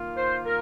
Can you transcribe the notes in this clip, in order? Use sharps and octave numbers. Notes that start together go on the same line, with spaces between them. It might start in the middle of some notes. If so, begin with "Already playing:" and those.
Already playing: D#3 A#3 F4
C5
A#4